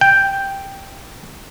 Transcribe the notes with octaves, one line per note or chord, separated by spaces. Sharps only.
G5